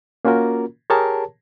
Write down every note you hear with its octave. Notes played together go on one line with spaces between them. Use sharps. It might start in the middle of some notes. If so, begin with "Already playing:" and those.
A#3 C#4 F4 F#4 A#4
G4 G#4 A#4 C#5 A5